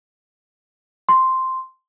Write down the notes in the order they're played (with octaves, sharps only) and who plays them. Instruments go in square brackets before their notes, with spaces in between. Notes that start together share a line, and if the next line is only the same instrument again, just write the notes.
[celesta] C6